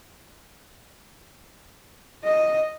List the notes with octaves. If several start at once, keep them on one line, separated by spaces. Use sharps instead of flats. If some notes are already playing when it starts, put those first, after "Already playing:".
D#5